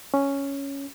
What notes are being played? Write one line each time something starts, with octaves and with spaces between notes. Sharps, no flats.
C#4